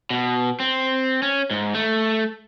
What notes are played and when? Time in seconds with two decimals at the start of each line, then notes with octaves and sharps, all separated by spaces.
0.10 B2
0.60 C4
1.22 C#4
1.51 G#2
1.75 A3